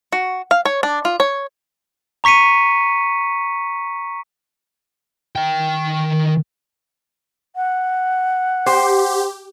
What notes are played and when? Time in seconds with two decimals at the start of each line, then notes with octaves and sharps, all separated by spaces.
0.12 F#4
0.51 F5
0.65 C#5
0.83 D4
1.05 F4
1.20 C#5
2.24 A#5 C#6 B6 C#7 D#7
5.36 D#3 G5
7.56 F#5
8.66 G4 C5